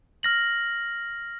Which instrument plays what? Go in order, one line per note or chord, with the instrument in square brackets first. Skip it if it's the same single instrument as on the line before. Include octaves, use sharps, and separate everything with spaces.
[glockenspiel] F6 A#6 F#7